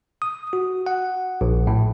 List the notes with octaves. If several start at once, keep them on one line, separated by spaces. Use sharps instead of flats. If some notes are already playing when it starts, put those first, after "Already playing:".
D#6
F#4
F#5
A#1
A2